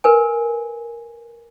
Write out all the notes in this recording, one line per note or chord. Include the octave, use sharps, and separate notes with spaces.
A#4 B4 G#5